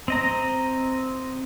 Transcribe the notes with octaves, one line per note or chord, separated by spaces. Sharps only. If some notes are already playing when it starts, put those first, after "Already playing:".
C4 D#5 A#5